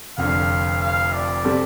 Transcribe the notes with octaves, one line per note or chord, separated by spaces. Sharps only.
F1 F2 D3 F5
F5
D5
C3 G3 C4 A4